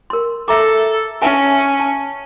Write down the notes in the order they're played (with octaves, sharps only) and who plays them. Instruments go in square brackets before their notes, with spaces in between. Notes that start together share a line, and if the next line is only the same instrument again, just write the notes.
[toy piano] A#4 C6
[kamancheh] A4 [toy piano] E5 A#5 D6
[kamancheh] C#4 [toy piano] E5 G#5 A5
[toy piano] A5